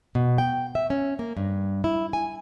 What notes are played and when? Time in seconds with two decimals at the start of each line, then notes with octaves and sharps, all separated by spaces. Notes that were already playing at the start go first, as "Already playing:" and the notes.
0.15 B2
0.38 G5
0.75 E5
0.90 C#4
1.19 A#3
1.37 G2
1.84 E4
2.13 G#5